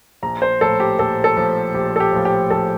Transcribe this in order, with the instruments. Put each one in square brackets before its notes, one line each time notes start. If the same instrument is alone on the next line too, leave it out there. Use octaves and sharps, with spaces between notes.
[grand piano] A#1 A#5
C5
A2 F3 A4
G4
A#1 A4
A4
A2 F3
A#1 G4
A4
G4
A2 F3
G4
A#1 A4